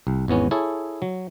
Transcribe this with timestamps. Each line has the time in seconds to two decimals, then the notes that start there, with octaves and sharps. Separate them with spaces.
0.07 C2
0.28 G#1 E2 B3 C#4
0.51 E4 G#4 A4 C#5
1.02 F#3